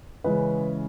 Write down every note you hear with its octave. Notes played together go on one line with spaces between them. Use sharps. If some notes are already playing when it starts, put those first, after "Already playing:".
C#3 E3 G#3 C#4 B4